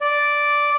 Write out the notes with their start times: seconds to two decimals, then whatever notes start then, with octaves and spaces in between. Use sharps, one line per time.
0.01 D5